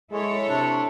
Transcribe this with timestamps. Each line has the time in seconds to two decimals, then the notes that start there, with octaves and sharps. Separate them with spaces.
0.11 G#3 E4 A4 C#5
0.49 C3 D4